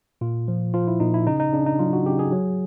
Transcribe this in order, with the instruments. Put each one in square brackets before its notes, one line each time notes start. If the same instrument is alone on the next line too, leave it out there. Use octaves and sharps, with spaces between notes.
[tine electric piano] A#2 F4
F3
F3 F4
E4
A#2 D#4
E4
C#3 D#4
D#4
C#3 D4
D#4
F#3 F4
F#4
C#3 G4
G#4
F#3